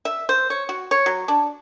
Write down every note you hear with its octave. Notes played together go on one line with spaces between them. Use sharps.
E5
C5
C#5
F#4
C#5
F#3
D4